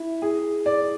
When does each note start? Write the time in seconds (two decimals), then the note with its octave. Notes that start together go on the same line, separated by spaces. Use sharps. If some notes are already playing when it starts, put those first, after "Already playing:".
Already playing: E4
0.22 G#4
0.66 D5